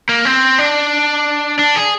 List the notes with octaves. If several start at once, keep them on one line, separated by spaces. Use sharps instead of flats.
A#3
C4
D4
D4
G#4